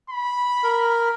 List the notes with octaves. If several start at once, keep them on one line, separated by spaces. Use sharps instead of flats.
B5
A#4